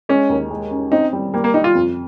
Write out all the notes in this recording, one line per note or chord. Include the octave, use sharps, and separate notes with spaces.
G#3 C#4
D#2
G#3
C#4
C4 D#4
G3
G3 A#3
A#3
G3 D#4
F4
F2